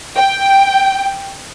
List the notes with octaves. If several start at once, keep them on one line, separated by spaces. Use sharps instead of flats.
G5